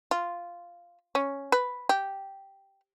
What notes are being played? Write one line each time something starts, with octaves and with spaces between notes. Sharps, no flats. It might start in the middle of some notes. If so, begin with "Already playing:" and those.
F4
C#4
B4
G4